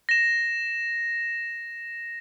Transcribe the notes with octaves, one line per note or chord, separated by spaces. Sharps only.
A#6 E7